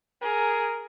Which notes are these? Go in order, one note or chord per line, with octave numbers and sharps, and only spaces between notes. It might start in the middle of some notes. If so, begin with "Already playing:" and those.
G#4 A#4